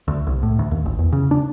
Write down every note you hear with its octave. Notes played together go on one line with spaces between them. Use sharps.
D2
C2
A2
D2
D#2
G#1
E2
C#3
D4